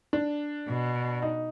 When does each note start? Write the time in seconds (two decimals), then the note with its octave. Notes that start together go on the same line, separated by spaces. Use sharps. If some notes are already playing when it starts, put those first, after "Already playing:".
0.13 D4
0.68 B2
1.22 D#4